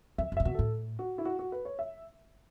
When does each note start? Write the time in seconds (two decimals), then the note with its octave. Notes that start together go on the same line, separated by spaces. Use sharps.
0.18 F#2 E5
0.32 F#2
0.37 A2 E5
0.45 B2 F#4
0.54 A2 A4
0.99 F#4
1.18 E4
1.25 F#4
1.39 F#4
1.52 B4
1.65 C#5
1.79 E5